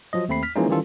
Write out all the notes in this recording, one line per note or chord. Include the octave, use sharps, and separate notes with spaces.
F3 F#3 D#5
D#2 A3 C4 B5 C7
F6 B6
E3 F3 G#3 A#3 C#4 D#4
D#3 E3 G3 C#4 F4 A4